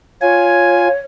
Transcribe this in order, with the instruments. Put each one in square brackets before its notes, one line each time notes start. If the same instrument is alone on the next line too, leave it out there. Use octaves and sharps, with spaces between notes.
[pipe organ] F4 G#5 [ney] C#5